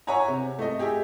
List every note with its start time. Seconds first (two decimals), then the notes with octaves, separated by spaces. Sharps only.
0.07 C#5 E5 F#5 G#5 A#5
0.28 C3
0.59 A3 D#5
0.79 G4 G#4 E5